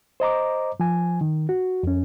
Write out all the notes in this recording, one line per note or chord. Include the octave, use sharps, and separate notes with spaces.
C5 D#5 A#5 D6
F3 G#5
D#3
F#4
F2 C#4